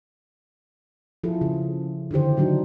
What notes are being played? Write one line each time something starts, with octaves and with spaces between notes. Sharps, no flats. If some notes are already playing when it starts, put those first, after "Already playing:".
F3 E4 F4 G#4 A4
C#3
D3 D#3 E4 G4 C5
C#3 F#3 D4 D#4 F#4